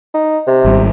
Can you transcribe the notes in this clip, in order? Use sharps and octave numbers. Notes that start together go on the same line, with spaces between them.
D#4
C3
G#1 G3